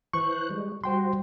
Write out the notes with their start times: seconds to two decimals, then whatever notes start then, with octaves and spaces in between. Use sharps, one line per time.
0.13 E3 C5 C#6 F#6
0.51 G3 G#3
0.84 G3 F#4 C5 G5 C6